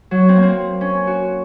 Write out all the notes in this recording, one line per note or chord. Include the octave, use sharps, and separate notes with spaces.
F#3
C4
A#3
C4
C#4
F#4